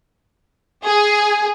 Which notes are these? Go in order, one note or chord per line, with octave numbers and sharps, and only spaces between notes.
G#4